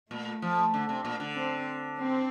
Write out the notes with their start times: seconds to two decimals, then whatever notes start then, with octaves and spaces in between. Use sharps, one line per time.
0.11 A#2 A3
0.42 F3
0.74 D3
0.89 C3
1.05 A#2
1.20 D3
1.36 C4
1.98 C4